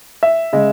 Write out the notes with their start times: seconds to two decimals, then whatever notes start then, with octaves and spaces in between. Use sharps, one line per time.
0.23 E5
0.53 C#3 G#3